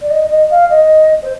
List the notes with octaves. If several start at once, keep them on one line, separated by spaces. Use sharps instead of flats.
D5
D#5
D#5
F5
D#5
C5